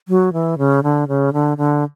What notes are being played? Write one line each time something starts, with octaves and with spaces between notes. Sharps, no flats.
F#3
E3
C#3
D3
C#3
D3
D3